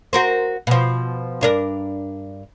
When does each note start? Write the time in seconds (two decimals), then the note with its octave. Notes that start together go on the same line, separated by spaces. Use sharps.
0.13 F#4 A#4 C5
0.67 B2 F3
1.41 G2 D4 A#4